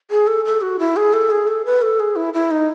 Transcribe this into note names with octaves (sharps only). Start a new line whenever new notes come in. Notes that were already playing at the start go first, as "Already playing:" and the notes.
G#4
A4
A4
F#4
E4
G#4
A4
G#4
A4
B4
A4
G#4
E4
E4
D#4